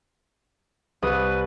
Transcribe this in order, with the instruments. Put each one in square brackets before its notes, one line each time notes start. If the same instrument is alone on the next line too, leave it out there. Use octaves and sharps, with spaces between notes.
[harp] C2 B5 D#6 [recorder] B4